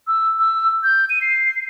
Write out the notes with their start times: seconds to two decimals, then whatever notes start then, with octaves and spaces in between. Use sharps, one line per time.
0.07 E6
0.39 E6
0.83 G6
1.10 D#7
1.21 C7